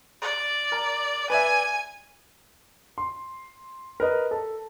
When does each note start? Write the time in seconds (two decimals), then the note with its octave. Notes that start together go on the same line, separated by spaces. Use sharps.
0.22 D5
0.72 A#4
1.30 B4 D5 E5 G#5
2.98 C6
4.00 A#4 B4 D#5
4.31 A4